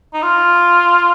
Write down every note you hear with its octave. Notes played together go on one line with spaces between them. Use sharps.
D#4
F4